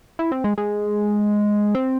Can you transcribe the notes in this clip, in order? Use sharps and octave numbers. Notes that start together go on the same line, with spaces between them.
E4
C4
G#3
G#3
C4